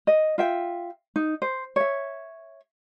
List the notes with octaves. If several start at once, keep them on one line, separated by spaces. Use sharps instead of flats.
D#5
F4 E5 G5
D#4
C5
C#5 E5